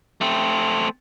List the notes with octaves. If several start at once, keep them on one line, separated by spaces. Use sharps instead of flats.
A3 C4